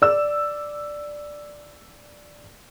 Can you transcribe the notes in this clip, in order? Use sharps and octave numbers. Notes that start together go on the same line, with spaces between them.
D5 E6